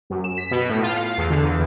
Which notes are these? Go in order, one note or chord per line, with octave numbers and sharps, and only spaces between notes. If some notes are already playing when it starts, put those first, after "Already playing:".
F#2
E7
B6
B2
A2
F4
F5
E2
D3
E2